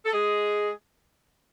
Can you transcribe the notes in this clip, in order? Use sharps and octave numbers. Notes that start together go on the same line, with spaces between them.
A4
G#3 G#4